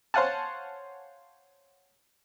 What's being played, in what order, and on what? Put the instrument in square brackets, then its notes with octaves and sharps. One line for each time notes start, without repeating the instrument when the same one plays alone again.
[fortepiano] C5 C#5 F5 F#5 G#5 A5